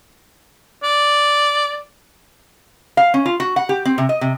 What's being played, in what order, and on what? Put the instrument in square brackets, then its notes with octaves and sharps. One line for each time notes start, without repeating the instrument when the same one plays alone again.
[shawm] D5
[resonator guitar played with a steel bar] F5
C#4
F4
F#4
F#5
G4
C4
C3
D#5
C3